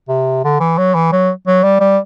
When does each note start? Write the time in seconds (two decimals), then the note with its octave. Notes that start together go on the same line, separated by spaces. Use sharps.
0.09 C3
0.44 D3
0.60 E3
0.78 F#3
0.94 E3
1.12 F#3
1.47 F#3
1.63 G3
1.80 G3